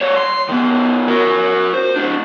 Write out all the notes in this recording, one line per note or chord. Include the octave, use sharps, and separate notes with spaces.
G3 C#5
C6
D#3 B3
F#4 A#4
C5
A2 D4